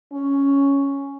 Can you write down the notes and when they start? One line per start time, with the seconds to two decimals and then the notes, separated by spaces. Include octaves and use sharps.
0.12 C#4